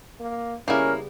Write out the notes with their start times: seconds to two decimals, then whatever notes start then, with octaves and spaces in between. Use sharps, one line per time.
0.20 A#3
0.68 C#3 G3 A#3 B3 C#4 E4 A#4